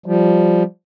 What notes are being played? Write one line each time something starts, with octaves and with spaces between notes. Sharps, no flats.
F3 G3